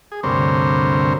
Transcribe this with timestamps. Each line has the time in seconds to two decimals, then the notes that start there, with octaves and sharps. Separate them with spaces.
0.12 G#4
0.23 D2 G2 C3 A#4 C5 C#5